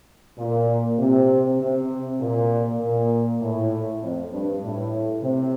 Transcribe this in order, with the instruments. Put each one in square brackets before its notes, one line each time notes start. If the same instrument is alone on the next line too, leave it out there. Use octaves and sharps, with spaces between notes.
[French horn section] A#2
C3
C3
A#2
A#2
A2
F2
G2
A2
C3